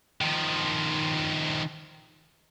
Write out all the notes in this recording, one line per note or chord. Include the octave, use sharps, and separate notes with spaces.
D#3 F3